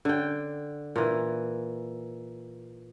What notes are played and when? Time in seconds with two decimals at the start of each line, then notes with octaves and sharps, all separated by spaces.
0.05 D3 G5
0.96 A#2 E3